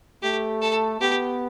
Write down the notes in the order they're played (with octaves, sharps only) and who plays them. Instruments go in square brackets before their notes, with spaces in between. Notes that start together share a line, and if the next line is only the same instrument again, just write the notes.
[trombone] A3 [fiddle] G4
[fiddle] A4
[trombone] B3 [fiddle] G4